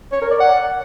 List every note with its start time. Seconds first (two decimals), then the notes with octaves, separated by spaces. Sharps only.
0.12 C#5
0.21 A#4
0.31 D5
0.40 F#5